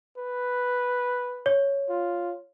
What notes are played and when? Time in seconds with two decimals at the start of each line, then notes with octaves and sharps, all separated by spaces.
0.18 B4
1.46 C#5
1.89 F4